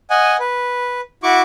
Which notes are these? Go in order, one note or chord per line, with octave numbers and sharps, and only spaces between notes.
D#5 F#5 G#5
B4
E4 F#4 C#6 D6